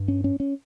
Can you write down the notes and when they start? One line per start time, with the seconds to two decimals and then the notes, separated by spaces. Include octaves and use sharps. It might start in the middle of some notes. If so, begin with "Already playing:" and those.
Already playing: G2
0.08 C#4
0.24 C#4
0.40 C#4